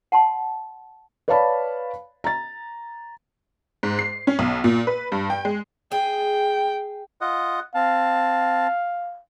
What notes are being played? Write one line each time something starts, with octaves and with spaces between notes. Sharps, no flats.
F#5 A5 C6
B4 C#5 D5 F5 A5 B5
A#5 A6
G#2
C7
C#4
B1
A#2
B4
G2
G5
G#3
G#4 G5
F4 D#5 F#5
C4 F5 A5